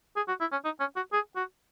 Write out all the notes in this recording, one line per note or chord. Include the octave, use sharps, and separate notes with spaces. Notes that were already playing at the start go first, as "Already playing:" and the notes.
G#4
F#4
E4
C#4
D#4
C#4
F#4
G#4
F#4